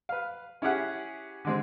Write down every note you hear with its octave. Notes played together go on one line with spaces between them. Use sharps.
B4 F5
C#4 E4 G4 G#4 F#5
D3 G#3 C4